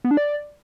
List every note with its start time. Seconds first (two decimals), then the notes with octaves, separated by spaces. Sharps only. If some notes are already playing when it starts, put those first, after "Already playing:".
0.04 B3
0.11 D4
0.17 D5